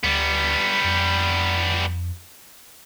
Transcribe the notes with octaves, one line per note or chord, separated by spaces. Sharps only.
D2 G3 B3
F2